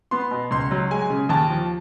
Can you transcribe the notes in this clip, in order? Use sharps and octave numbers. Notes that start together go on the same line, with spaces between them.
B3 C6
B2
C#2 C6
F#3
G#3 G#5
C#3
D#2 A5
F3